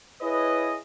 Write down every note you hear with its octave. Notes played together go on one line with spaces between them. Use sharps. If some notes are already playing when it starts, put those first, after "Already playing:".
E4 G#4 B4 C#5 D#5